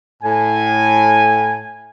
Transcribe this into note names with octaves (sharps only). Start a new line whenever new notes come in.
A2 G#5